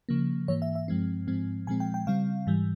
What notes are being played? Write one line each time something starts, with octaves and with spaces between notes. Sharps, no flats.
C#3 F3 A#3
G#2 E3 A#3 C#5
E5
E5
G2 F3 G#3 C4
G#2 F3 G#3 C4
A#2 F3 G#3 C4 G#5
G5
G5
C#3 G3 C4 F5
G#2 E3 G3